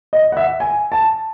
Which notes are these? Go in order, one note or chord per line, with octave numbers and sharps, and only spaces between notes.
D#5
F#5
E5
G#5
A5